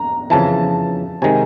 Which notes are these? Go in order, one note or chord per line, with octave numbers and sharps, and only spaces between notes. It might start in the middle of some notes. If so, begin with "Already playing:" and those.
Already playing: A#5
F2 C#3 E3 A5
C3 D#3 G#3 G#5